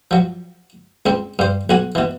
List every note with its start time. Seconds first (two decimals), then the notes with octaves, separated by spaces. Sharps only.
0.11 F3 F#3
1.06 C#2 C4
1.39 G2 C5
1.70 B1 F#4 G#5
1.95 B2 E3